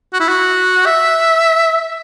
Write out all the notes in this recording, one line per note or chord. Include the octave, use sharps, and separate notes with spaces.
F#4
E4
F#4
E5